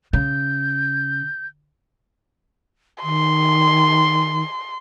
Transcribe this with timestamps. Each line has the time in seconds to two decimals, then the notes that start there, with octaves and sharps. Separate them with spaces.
0.13 C#3 G6
3.03 D#3 C6